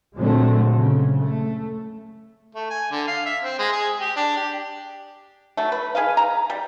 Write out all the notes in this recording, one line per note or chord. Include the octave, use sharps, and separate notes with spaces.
A#2 D3 F#3 G#3 A3 C4
C#3
A3
A3
G#5
D3
F5
E5
C4
G#3
G#4
G4
D4
G4
F#3 A3
B4
G#4 B4 D#5 F5
A#5
G3